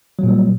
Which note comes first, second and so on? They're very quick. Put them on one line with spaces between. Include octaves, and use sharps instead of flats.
F#3 A#2 G3